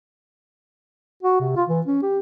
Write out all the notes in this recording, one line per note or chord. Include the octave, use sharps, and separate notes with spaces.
F#4
C3
F4
E3
C#4
G4